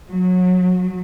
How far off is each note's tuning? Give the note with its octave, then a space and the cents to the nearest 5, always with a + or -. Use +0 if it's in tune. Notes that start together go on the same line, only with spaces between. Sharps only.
F#3 -25